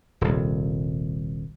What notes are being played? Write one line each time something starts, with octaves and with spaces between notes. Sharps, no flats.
D#1 C2